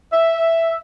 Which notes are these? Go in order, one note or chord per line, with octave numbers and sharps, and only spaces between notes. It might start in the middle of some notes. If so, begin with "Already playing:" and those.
E5